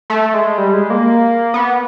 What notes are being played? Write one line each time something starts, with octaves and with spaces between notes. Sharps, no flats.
A3
G#3
G3
G#3
A#3
B3